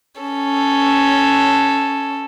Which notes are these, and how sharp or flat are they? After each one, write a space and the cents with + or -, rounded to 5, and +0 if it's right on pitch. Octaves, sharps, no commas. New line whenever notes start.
C#4 +0 A4 +0